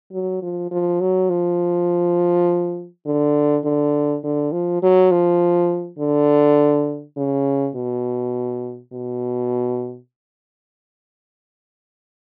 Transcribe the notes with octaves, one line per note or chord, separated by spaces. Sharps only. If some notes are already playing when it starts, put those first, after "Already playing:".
F#3
F3
F3
F#3
F3
D3
D3
D3
F3
F#3
F3
D3
C#3
B2
B2